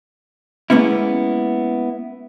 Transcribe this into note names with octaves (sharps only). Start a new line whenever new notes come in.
G#3 A#3 B3 C#4 E4